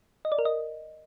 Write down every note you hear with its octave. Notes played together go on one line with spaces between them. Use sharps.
D#5
D5
A#4
D#5